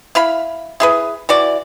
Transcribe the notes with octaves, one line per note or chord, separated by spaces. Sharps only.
E4 F5 B5
E4 G#4 B4
E3 F#4 D5